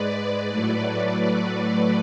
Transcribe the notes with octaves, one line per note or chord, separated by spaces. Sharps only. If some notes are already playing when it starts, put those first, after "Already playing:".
Already playing: G#2 G#3 B4 D5
A2 F#3 A3